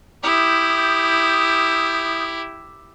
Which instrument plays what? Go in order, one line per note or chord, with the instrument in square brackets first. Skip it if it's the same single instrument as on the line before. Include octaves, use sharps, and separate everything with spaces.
[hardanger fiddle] E4 G4 [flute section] D#6 G6